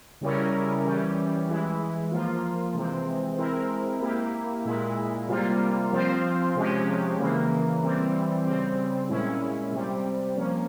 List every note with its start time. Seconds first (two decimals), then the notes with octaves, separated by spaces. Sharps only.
0.21 C#3 G3 C#4 E4 A#4
0.85 E3 G3 C#4 G4
1.48 E3 G#3 E4
2.12 F3 A#3 F4
2.75 C3 E3 G#3 C4
3.38 G#3 C4 E4 A#4
4.01 A#3 E4 G4
4.65 A#2 G#3 E4
5.28 C3 G3 A#3 F4
5.92 F3 C4 F4 C5
6.56 C3 F3 G#3 C#4 G4
7.18 C#3 E3 A#3
7.82 E3 G3 C4
8.45 C#3 G3 C4
9.09 A#2 G#3 C#4 E4
9.72 C3 G3 C4 G4
10.35 F3 A#3 C#4